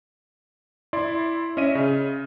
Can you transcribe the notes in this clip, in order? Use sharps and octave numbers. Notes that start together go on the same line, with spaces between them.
E4 D5 C6
C#4 D#5 E5 D#7
C#3